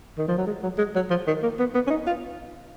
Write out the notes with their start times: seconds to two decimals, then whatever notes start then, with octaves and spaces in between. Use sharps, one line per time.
0.18 D#3
0.28 F3
0.38 F#3
0.47 G#3
0.63 F#3
0.78 G#3
0.95 F#3
1.10 F3
1.27 D#3
1.43 A#3
1.59 B3
1.75 B3
1.87 C#4
1.90 D#4
2.07 F4